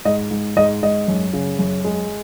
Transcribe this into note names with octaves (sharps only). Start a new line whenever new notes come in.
G#2 D#5
G#2
G#2 D#5
G#2 D#5
F#2
C#3
F#2
G#3